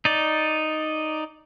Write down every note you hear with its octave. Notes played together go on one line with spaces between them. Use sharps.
D#4 D5